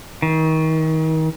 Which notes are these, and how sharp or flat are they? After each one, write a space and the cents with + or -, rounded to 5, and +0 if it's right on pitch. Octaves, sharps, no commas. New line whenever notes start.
D#3 +35